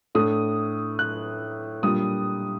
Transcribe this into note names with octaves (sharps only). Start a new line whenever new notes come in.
A2 A3 D4 D#6
F#6
A#2 G3 D4 D#6